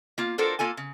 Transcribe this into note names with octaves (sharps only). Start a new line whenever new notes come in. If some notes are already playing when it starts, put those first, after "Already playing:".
A#3 F4
D4 F4 F#4 A4 A#4 C5
A#3 F4 A4 G#5
C#3